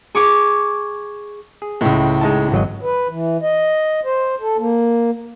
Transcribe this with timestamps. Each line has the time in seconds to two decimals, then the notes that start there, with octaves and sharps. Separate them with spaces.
0.15 G#4 C#6 D6
1.62 G#4
1.81 C#2 A2 G#3
2.21 G#3 D#4 A5
2.52 G#1 F#3 D#5
2.83 B4
3.09 E3
3.43 D#5
4.05 C5
4.41 A4
4.58 A#3